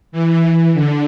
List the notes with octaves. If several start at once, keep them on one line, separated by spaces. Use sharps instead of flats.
E3
D3